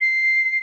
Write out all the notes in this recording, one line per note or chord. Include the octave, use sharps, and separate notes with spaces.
C7